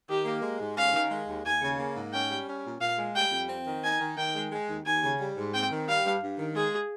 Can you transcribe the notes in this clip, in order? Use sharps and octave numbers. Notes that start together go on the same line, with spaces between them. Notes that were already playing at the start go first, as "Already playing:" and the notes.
D#3 G4
A#3
G#3
G#2
C#4 F5
D#3
G#3
D#2
D#2 G#5
C#3
A#3
G#2
C#4 G5
G3
C#4
A#2
A#2 F5
G#3
G3 G5
F2
C4
D#3
D#4 G#5
D#3
D#3 G5
G#3
G#3
D#2
D#2 G#5
C#3
G3
G#2
C4 G5
D#3
G3 F5
G2
G2
D#3
G#3 G#4